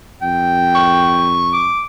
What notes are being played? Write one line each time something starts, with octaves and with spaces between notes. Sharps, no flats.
F2 G5
C#6
D6